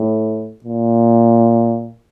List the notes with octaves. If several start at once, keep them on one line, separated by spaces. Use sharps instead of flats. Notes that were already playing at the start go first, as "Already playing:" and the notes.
Already playing: A2
A#2